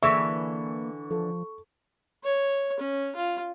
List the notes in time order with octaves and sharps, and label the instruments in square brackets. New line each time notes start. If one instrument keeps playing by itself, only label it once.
[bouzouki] D3 E3 [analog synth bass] A#3 [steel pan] G#4 E5 [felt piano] C#6
[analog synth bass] F3 [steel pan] A4
[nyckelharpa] C#5
C#4
F4